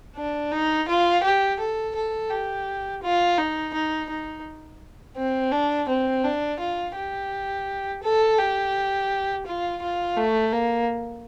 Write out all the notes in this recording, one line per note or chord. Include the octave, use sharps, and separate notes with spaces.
D4
D#4
F4
G4
A4
A4
G4
F4
D#4
D#4
D#4
C4
D4
C4
D4
F4
G4
A4
G4
F4
F4
A3
A#3